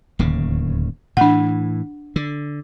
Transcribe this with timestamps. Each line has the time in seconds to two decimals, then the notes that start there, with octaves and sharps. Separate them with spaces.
0.19 D1 D#2 C#3
1.17 A2 E3 D4 F#5
2.16 D3